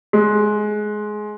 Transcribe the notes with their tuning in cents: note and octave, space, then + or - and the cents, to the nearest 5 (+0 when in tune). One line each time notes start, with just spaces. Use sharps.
G#3 +15